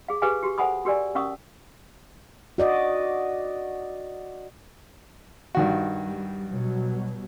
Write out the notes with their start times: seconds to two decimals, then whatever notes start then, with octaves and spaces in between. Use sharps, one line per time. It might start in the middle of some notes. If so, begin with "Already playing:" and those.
0.08 G#4 F5
0.22 G4 G#4 B4 F5 G#5
0.43 F#4 G4
0.58 A4 C5 F#5 G#5 B5 D#6
0.85 F#4 G4 A#4 D5 G#5
1.15 C#4 A#4 F5 C#6 D#6
2.58 F#4 D5 D#5
5.55 G2 D#3 F#4
6.04 G3
6.48 B2 F#3 G3